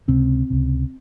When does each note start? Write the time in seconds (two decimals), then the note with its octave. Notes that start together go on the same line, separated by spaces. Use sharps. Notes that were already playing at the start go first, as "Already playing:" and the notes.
0.08 C#2 C3 C4
0.50 C#2 C3